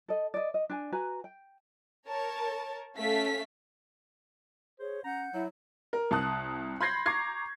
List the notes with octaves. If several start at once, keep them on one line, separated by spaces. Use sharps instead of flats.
A4 D#5
D5 D#5
D#5
D4 G#5
F#4 B4 G#5 A#5
G5
A#4 C#5 A5
A3 C#4 A4 E5 F5 B6
G#4 C5 C#5
C#4 F#5 A#5 G6
F#3 E4 E5
A#4
C2 A5 D#6 F#6
B5 C6 G6 G#6 A#6 C7
A#5 C#6 D6 G#6 C7